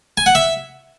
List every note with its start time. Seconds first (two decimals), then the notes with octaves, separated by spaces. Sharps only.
0.17 G#5
0.26 F#5
0.35 E5